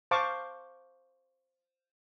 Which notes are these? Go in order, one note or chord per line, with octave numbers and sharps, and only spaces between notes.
C5 F5 A5 C#6 D6